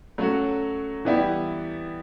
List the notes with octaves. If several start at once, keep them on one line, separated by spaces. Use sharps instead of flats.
F#3 A3 C#4 F#4
E3 G3 B3 E4 G4